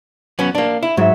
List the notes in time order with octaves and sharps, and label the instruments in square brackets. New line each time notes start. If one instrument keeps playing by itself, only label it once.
[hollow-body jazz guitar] F#3 B3 C#4
A#3 D4
E4
[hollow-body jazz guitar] G#2 [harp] F#3 E5